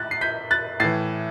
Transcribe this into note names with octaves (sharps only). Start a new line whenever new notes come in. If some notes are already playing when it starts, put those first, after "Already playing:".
Already playing: A2 F#6 A6
C7
G6 B6
F#6 A6
A2 E3 A6 C7